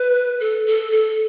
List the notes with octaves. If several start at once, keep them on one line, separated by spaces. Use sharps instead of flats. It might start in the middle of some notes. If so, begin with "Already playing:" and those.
Already playing: B4
A4
A4
A4